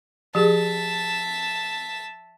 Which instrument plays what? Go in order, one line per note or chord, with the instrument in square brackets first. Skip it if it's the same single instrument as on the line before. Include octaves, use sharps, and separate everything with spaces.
[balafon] F3 G4 G#4 [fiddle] E5 A5